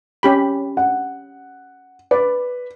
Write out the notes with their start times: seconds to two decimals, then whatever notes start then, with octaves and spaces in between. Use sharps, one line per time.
0.23 C#4 G4 B5
0.77 F#5
2.11 B4 D5